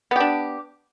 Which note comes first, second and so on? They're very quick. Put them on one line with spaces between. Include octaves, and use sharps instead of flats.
B3 G4 D4